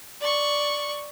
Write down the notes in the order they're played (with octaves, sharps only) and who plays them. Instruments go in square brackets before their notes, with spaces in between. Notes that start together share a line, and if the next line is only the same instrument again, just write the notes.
[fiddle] D5 C#6